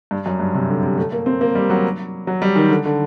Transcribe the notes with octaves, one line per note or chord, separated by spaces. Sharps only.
G2
F#2
G2
C3
D3
C3
A3
A#3
C4
A#3
G3
F#3
F#3
G3
D#3
D3
D3